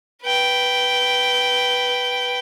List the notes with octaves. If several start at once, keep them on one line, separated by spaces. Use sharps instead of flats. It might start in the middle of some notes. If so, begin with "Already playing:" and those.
B4 G5